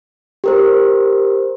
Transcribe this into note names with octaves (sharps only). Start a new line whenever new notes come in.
G4 A#4 C5